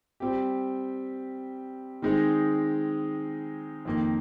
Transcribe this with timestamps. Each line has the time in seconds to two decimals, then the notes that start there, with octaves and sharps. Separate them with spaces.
0.20 G3 C4 G4
2.02 D#3 G#3 C4 D#4 G#4
3.85 F2 D#3 A#3